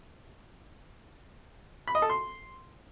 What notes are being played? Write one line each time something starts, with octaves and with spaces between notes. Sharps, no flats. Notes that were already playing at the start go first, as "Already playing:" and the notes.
B5
D#5
A4
C6